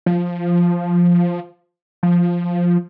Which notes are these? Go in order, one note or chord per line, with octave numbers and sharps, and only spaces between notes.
F3
F3